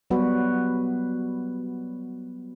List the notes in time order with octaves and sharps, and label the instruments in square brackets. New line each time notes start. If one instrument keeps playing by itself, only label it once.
[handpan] F#3 G3 B3 F#4 B4